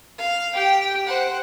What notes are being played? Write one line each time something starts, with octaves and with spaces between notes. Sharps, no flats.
F5
G4 G5
C5 F#5